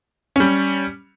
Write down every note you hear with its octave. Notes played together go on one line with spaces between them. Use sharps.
G3 C#4